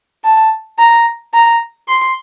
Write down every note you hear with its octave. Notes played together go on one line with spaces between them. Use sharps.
A5
A#5
A#5
C6